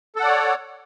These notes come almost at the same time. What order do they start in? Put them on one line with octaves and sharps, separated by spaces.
A4 F#5 D5 C#5